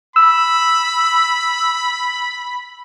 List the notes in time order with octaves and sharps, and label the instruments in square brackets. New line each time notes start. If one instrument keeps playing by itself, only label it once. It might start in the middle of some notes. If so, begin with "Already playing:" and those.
[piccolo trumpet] B5 [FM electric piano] E6